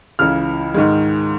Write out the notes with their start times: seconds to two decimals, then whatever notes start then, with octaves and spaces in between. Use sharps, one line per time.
0.19 C#2 C#3 E3 F6
0.74 G#2 D#3 G#3